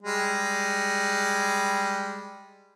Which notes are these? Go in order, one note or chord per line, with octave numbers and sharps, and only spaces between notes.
G3 G#3